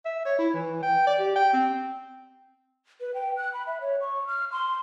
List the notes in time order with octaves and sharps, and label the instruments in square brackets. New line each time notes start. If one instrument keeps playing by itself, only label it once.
[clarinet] E5
C#5
E4
E3
G5
D5
G4
G5
C4
[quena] B4
G5
F#6
B5
E5
C#5
C#6
F6
C6